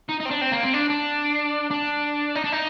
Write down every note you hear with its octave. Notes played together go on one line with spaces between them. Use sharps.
D#4
D#4
C4
D4
C4
A#3
C4
D4
D4
D4
D#4
D4
D#4